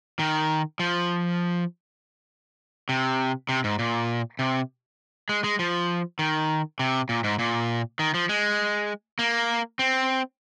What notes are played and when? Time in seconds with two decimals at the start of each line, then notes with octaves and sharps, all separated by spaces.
0.19 D#3
0.80 F3
2.89 C3
3.49 C3
3.64 G#2
3.79 A#2
4.39 C3
5.29 G#3
5.44 G#3
5.59 F3
6.19 D#3
6.79 C3
7.09 A#2
7.24 G#2
7.39 A#2
7.99 D#3
8.14 F3
8.29 G#3
9.19 A#3
9.79 C4